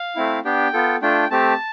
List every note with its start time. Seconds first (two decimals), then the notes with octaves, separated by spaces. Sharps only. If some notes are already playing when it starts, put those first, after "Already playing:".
Already playing: F5
0.16 A3 C4 E4
0.45 B3 D4 G4 G5
0.73 B3 F4 A4
1.02 A3 D4 F4 G5
1.31 A3 C4 G4 A5